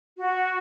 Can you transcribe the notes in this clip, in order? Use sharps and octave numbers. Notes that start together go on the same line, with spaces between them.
F#4